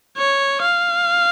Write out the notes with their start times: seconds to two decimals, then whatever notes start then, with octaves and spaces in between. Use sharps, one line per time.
0.18 C#5
0.62 F5